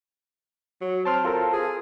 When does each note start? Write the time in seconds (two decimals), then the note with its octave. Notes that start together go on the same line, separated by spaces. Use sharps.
0.81 F#3
1.05 C4 A5 C6 F6
1.25 F4 A4 A#4
1.53 G#4